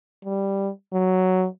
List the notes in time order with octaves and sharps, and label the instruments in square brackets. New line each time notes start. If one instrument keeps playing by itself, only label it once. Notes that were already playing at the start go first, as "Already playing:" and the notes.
[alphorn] G3
F#3